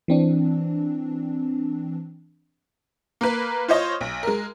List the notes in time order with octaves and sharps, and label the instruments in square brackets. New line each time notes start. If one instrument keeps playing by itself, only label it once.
[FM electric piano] E3 C4 D4
[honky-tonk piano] A#3 A#4 B4
F4 C5 C#5 D#5
B1
G#3 A#4